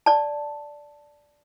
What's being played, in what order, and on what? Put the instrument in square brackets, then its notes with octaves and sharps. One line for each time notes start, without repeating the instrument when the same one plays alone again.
[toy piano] D5 A5